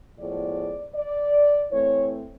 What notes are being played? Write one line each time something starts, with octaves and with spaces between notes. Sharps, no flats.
A2 F3 G#3 B3 D5
D5
E3 A3 C4 C#5